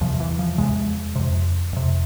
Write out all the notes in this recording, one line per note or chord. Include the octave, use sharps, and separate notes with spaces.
E2 C3 F3
E3
F3
E2 C3 G#3
F2 C3
F2 C3